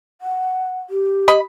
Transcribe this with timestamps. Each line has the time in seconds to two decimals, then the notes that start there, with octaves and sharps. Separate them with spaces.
0.21 F#5
0.89 G4
1.28 D#5 B5